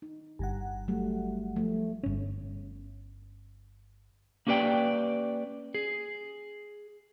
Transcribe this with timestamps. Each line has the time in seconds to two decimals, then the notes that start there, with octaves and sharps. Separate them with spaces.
0.02 D#4
0.39 G1 G2 F#5
0.88 F#3 G3 A3
1.56 F3 A3
2.03 G1 C#4
4.47 A#3 C#4 G4 B4 D5 G5
5.75 G#4